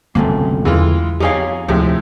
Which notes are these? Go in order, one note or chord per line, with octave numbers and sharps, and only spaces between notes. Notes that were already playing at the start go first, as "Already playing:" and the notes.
G1 C#2 F#2 C3 A3 A#3
E2 E3 G#3 F4
F2 D#4 G4 G#4 C#5 F5
D2 A2 C3 F3 G#3